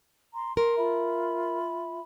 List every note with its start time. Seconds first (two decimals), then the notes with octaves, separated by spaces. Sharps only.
0.34 A#5 C6
0.57 A#4 A#5 C6
0.77 F4 E5 B5